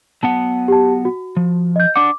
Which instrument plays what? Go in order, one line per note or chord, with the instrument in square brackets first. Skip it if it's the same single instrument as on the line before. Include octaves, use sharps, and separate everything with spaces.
[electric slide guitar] F#3 B3 F#5 [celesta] A5
[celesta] G4 A5
F#4
[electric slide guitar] F3
[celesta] D#5 G6
[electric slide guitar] D4 F#5 [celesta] D6